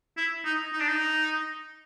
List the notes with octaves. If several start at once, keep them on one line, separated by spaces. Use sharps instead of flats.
E4
D#4
D#4
D4
D#4